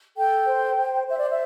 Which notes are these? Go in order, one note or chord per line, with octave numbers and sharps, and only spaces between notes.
A4 G5
C5
C5
C5 E5
D5
E5